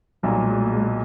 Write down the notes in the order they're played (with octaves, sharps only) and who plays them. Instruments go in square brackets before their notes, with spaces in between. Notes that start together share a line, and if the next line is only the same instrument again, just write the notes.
[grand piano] B1 A#2 F#3 [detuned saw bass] G3
[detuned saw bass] G#3
A3
G#3